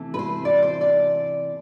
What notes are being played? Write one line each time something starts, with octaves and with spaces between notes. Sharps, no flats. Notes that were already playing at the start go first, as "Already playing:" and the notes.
Already playing: C3 E3 A3 C4
B4
C5
D5
C5
D5